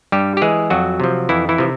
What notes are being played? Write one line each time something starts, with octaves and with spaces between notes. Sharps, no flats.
G2 G3 G4
G4
E3 G#3 G#4
F2 F#3 F#4
C3 F3
F2 E3 E4
E3 E4
C3 F3